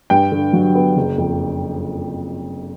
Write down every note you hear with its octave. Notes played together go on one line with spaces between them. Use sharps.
G2 G5
D3
F#3
B3
F#1
F2